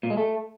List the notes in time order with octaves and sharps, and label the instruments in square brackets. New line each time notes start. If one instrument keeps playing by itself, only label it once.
[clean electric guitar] A#2
G#3
A3